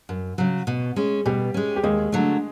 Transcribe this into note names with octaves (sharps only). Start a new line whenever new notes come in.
F#2
C#3 F#3
B2
G#3 C#4
B2 G3 G4
G#3 C#4
G4
D#2 G#3 G#4
D3 F#3 A3